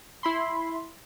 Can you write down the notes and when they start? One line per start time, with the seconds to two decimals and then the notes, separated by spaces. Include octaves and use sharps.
0.23 E4 B5 C6